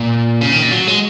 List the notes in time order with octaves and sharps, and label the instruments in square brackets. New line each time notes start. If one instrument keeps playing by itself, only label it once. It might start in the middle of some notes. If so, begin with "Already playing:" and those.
Already playing: [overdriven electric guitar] A#2
C#3
D#3
A#2
F#3
G#3